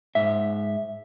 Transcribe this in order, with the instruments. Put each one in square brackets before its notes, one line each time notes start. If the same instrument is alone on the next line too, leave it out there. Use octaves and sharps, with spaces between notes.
[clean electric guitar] G#2 E5